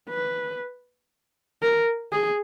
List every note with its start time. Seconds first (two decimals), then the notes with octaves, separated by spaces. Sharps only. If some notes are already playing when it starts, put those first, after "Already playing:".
0.09 B4
1.62 A#4
2.12 G#4